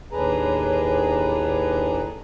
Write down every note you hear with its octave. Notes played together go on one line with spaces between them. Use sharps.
D#2 A2 D4 G#4 B4 A#5